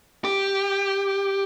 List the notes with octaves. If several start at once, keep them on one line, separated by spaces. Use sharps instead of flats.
G4